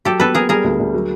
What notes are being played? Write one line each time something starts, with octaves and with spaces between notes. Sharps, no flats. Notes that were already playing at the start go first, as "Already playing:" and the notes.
F#3 G4 A4
B3 A4 B4
B3 G#4 A#4
G3 G#4 A#4
D2
D2
F#3